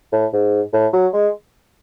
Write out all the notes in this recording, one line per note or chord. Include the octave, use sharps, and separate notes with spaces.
A2
G#2
A2
F#3
G#3